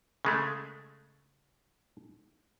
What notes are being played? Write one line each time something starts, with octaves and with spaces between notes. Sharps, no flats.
C#3 G#3 A3